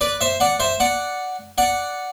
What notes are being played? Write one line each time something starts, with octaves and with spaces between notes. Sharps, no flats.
B4 D5
C5 E5
D5 F#5
C5 E5
D5 F#5
D5 F#5